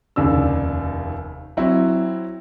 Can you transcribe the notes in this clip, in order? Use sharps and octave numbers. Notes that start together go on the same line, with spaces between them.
F1 D#2 C#3 D4 E6
F#3 C4 E4